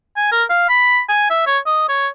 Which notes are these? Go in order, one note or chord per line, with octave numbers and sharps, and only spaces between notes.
G#5
A#4
F5
B5
G#5
E5
C#5
D#5
C#5